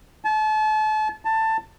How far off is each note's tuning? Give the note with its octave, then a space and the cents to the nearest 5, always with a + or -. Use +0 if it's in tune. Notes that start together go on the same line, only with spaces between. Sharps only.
A5 -35
A5 +15